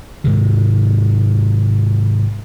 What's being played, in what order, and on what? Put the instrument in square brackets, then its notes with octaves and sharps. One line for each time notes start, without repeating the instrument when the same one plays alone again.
[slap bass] G#2 C3 D#3